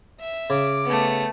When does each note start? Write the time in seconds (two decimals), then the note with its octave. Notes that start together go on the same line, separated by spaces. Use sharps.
0.20 E5
0.50 C#3 D6
0.85 A3 B3